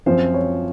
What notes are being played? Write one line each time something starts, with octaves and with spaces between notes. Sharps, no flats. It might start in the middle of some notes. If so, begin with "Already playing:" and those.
F#2 F3 C4 F4 C5
C#5